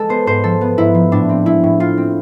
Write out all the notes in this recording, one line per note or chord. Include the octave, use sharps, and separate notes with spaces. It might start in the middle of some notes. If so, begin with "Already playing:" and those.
Already playing: G#3 A4
B3 C5
G#2 C5
F3 A4
B3
G#2 E4
F3
A2 D4
C4
G#3 E4
A2
C4 F4
C4